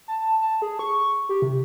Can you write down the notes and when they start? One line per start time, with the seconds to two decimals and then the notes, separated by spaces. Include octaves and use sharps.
0.08 A5
0.42 A5
0.62 G#4
0.79 C#6
1.29 G4
1.42 C3